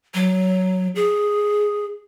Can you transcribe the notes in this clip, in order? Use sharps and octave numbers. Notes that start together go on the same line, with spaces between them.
F#3
G#4